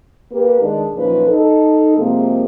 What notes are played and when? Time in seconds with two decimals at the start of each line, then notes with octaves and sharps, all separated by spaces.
0.32 A#3 G4 B4
0.61 D#3 G#3 D4
0.95 F#2 A#2 F3 C#4 D#4 B4
1.27 D#4 A4
1.97 C3 F3 G#3 A#3